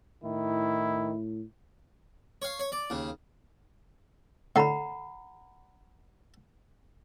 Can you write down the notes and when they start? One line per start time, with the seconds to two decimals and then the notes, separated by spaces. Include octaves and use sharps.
0.24 A2 D#3 E4
2.42 C#5 F5
2.60 C#5
2.72 D5
2.90 D#2 C#3
4.56 A2 D3 F#5 A#5 B5